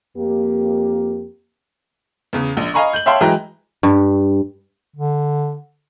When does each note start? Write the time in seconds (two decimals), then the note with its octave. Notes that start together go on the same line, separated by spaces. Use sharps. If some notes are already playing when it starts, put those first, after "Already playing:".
0.17 F2 A#3 G4
2.33 E2 C#3
2.57 A#1
2.74 D#5 F5 G#5 A#5 B5 C#6
2.93 G6 F#7
3.06 C#5 E5 F5 G5 A5 C6
3.21 E3 F#3 G#3 G5 A#5
3.83 G2
4.96 D3